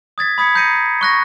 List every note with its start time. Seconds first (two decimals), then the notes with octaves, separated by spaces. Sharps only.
0.18 D#6 G#6 A6 B6
0.38 B5 D#6 G#6 B6 C#7
0.55 A#5 G6 A#6 C7 C#7 D#7
1.01 C#6 F#6 A#6